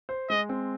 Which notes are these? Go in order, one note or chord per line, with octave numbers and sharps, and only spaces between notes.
C5
G#3 D#5
C4